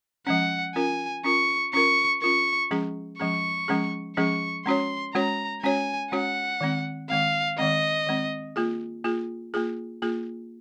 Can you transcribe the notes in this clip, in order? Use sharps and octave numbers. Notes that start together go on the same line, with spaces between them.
F3 G#3 C#4 F#5
C#4 F4 A#4 G#5
C#4 F4 A#4 C#6
C#4 F4 A#4 C#6
C#4 F4 A#4 C#6
F3 G#3 C#4 G#4
F3 G#3 C#4 G#4 C#6
F3 G#3 C#4 G#4
F3 G#3 C#4 G#4 C#6
G#3 C#4 F#4 C#5 C6
G#3 C#4 F#4 C#5 A#5
G#3 C#4 F#4 C#5 G#5
G#3 C#4 F#4 C#5 F#5
D#3 G#3 C4
D#3 G#3 C4 F5
D#3 G#3 C4 D#5
D#3 G#3 C4
A#3 F4 G#4
A#3 F4 G#4
A#3 F4 G#4
A#3 F4 G#4